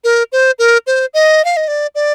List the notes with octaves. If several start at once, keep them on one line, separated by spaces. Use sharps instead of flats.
A#4
C5
A#4
C5
D#5
F5
D#5
D5
D5